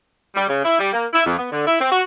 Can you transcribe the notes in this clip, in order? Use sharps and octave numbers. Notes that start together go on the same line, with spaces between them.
G3
C#3
E4
G3
A#3
E4
F2
B3
D3
E4
C4
F#4